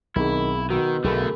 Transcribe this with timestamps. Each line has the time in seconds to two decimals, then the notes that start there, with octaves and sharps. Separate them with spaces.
0.16 B1 D#3 C4 E4 G#4
0.70 B2 D#3 F#4 E6
1.04 B1 D3 A3 G#4 A#4 B5